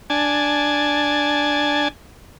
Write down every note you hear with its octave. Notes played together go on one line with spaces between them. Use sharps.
D4 G#5 A5